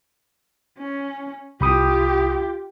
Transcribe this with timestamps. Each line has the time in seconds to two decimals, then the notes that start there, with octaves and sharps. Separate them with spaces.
0.78 C#4
1.61 C2 F4 G4 B5 D#6